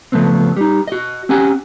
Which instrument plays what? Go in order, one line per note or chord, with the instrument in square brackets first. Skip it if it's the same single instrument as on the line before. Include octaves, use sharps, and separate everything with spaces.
[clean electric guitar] C#3 F3 A3 B3 C4
G3 D#4
F#4 D#5
C4 C#4 G4 F#5 G#5